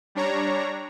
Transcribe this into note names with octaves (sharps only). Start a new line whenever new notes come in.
G3 D4 C#5 A#5